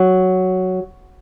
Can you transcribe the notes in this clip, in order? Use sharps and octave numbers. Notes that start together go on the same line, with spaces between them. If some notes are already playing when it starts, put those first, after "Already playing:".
Already playing: F#3